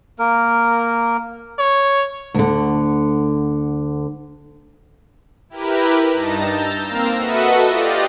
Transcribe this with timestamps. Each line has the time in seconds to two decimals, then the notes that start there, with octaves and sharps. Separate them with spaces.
0.19 A#3 A#4
1.59 C#5
2.34 D2 D3
5.50 E4 G4 A#4 B4
6.13 G2 D#4 A5 A#6
6.44 A#5 E6 G6 A6
6.85 A#3 C4 A#4 F5 A#5 E6
7.17 F#4 A4 B4 D#5 E5 F#5
7.66 F4 G4 D5 D#5